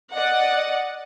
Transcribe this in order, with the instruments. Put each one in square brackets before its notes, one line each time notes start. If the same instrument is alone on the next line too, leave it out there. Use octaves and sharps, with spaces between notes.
[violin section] D5 D#5 F#5